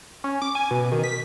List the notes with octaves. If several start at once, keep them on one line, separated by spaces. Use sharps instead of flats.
C#4
D6
G#5
B2
D#3
B6